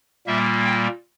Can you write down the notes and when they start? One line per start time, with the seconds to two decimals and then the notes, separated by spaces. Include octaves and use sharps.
0.27 A#2 G3 A#3 E5
0.65 G5